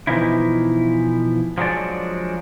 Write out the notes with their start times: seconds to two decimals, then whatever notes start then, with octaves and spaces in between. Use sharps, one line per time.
0.07 B2 E3 F3 D#4 E4
1.58 F3 F#3 G#3 D4 D5